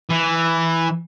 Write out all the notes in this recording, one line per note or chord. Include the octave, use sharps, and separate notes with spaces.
E3